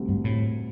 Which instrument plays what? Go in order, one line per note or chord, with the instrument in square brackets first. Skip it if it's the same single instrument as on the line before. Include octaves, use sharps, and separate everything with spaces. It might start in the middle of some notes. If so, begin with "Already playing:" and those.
Already playing: [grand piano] D2 C3 G3
[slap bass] G2
A2